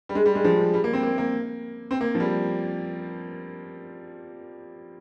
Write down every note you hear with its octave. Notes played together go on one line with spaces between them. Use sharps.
G3
G#3
G3
G#3
F3
G3
A#3
C4
A#3
A#3
C4
A#3
F3
G3